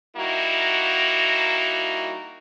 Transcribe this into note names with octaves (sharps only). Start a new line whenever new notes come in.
G3 A#3 D#4 E4 F#4